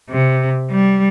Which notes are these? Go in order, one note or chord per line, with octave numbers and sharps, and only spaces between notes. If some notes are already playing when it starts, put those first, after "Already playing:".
C3
G3